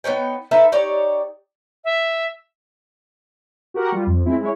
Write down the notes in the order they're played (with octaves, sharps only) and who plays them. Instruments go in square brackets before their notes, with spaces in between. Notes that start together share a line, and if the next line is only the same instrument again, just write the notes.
[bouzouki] B3 D#4 C#5 G5
D#4 A4 B4 E5
D#4 G4 C#5 D5
[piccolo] E5
[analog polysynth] F#4 G4 A#4 F#5
G3 F4
F2
G#3 C4 E4
G#3 E4 C#5